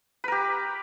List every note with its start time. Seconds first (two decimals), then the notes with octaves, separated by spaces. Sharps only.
0.24 B4
0.28 A#4
0.32 G4